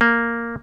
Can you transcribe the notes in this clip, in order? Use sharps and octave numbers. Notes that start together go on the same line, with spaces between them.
A#3